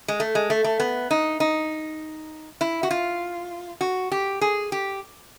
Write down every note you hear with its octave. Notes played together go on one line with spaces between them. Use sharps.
G#3
A3
G#3
A3
A3
B3
D#4
D#4
E4
F#4
F4
F#4
G4
G#4
G4